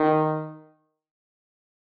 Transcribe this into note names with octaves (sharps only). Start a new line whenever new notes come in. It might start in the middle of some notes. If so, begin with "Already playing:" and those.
Already playing: D#3